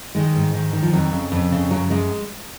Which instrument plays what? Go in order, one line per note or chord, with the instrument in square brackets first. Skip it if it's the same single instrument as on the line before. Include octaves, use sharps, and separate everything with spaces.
[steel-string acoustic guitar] D#3 G#3
G#2
D#3
D#3
F3
F2 F#3
C#3
F2
C#3
F#2 F#3
F#2 G#3